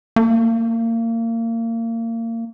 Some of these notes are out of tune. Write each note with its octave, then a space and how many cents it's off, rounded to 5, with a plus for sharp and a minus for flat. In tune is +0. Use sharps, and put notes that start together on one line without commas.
A#3 -30